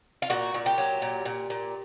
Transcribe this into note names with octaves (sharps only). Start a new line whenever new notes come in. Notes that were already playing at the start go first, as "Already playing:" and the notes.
F4
A#2 F#4
A#2
G4
F#3
A#2
A#2
A#2